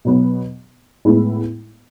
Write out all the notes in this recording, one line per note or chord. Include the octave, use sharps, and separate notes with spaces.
B2 F#3 B3
A2 G#3 B3 E4